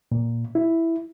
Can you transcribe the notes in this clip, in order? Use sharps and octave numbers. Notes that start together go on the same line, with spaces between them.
A#2
E4